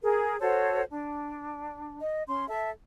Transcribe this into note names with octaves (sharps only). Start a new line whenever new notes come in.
G#4 A#4
F#4 A4 C5 C#5
D4
D#5
C#4 C6
A4 E5